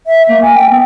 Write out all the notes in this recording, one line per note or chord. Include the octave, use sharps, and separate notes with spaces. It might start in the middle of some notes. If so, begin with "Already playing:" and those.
E5
A#3
G#5
G5
B3